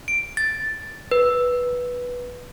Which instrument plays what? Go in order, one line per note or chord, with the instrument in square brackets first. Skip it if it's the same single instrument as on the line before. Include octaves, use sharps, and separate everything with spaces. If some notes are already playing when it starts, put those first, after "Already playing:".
[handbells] D7
A6
B4